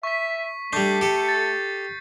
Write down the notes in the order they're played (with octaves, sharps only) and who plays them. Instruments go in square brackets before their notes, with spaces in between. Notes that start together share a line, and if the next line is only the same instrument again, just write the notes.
[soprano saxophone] E5 [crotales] C#6 B6
[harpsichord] G3 D4 [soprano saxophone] A3 [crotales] C#6 G6 C7
[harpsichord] G4 A4 [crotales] C#7
[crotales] A6